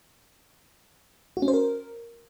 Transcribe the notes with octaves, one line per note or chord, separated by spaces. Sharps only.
F#4
C#4
C5
A#4